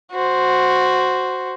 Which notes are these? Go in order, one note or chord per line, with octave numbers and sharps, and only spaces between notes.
F#4 C5